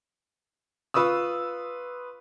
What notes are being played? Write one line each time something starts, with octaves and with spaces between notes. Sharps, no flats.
F4 B4 C#6 D#6 E6